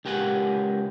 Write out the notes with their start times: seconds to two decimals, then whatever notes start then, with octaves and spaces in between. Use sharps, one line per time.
0.05 C#2 G4 A#4 F#5 G#5